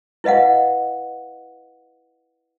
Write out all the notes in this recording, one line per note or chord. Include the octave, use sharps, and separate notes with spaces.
E4 B4 D#5 F5 F#5